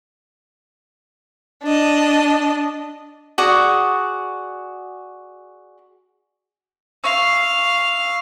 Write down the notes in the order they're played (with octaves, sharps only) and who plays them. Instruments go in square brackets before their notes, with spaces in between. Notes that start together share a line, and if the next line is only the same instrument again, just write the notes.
[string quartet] D4 D#5
[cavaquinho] F#4 G#4 D5 F#5
[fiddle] F5 [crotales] C#6 E6